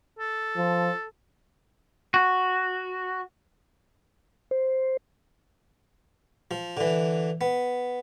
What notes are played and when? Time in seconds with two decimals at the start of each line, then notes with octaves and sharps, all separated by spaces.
0.19 A4
0.57 F3
2.14 F#4
4.51 C5
6.51 F3
6.77 D3 E3
7.41 B3